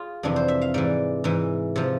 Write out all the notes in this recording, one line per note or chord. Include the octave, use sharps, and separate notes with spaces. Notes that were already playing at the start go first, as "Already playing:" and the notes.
Already playing: F4 G#4
F2 C3 E3 D4
C5
E5
F5
G#2 E3 D5
G#2 E3
C3 F3